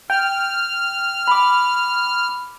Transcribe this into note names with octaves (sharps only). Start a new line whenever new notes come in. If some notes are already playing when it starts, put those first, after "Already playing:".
G5 F6
B5 D6